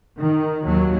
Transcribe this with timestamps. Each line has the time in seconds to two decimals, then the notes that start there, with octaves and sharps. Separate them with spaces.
0.18 D#3
0.64 D#2 F#3